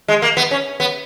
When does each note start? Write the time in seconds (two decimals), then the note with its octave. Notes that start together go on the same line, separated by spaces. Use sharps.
0.08 G#3
0.22 A#3
0.37 B3
0.51 C#4
0.80 B3